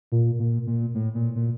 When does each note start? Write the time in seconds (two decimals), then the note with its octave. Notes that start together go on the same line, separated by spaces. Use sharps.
0.12 A#2
0.39 A#2
0.67 A#2
0.95 A2
1.15 A#2
1.36 A#2